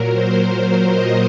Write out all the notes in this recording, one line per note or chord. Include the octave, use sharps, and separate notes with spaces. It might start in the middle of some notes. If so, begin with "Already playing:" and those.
Already playing: A#2 F#3 A#4
C5
D#5